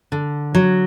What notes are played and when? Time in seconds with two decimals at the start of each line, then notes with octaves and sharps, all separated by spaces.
0.12 D3
0.55 F#3